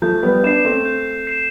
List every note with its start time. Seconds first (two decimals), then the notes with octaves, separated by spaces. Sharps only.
0.02 F3 A3 G6
0.23 G3 B3
0.44 B3 D4 C7 E7
0.65 A3 C4
0.85 G6
1.27 C7 E7